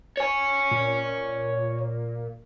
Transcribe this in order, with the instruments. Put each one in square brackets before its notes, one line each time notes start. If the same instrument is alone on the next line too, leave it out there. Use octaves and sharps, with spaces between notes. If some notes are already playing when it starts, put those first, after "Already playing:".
[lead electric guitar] C#5 G#5
[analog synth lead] A#2